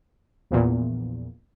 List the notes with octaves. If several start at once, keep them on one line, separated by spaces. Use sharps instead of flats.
A#1 E2 A#2